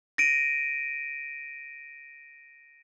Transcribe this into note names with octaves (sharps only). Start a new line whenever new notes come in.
A#6 D7 D#7